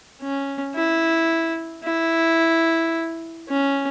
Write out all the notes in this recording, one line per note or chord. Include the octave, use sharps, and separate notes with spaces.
C#4
E4
E4
C#4